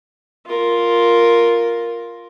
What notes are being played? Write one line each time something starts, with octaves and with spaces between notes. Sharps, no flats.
F4 A#4